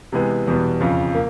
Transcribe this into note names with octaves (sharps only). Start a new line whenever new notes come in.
C3 E3 G#3 B3
E2 B2 G3 B3
F2 C#3 F3
A#3